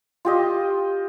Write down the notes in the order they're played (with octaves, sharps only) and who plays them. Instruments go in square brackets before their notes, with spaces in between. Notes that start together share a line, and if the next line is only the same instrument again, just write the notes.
[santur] F4 G4 D#5